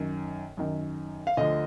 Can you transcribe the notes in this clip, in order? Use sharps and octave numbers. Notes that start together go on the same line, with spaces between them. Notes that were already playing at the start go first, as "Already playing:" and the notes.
Already playing: F#2 D#3
F#2 D#3
F5
D2 D3 F3 D#5